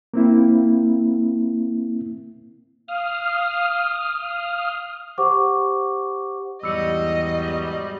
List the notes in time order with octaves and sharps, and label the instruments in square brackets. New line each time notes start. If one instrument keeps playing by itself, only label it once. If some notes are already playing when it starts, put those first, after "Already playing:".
[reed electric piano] A#3 C4 E4
[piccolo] F5 [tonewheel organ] D#6 F6
[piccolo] F5
[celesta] G4 C5 F#5 C#6 D6
[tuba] E2 [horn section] G#2 F#3 G3 [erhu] D#5 [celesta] E6 C#7